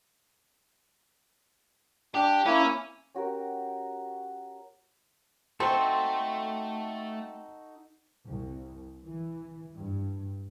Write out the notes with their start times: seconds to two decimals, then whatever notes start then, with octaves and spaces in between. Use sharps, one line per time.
2.15 D4 G4
2.46 A#3 C#4 E4
3.15 C#4 F#4 G4 A#4
5.60 A3 C4 D#4 F#4 A4 C6
8.26 C2
9.03 E3
9.75 G2